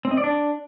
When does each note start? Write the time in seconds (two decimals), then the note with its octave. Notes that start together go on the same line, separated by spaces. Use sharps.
0.05 C4
0.11 D#5
0.17 D5
0.24 D4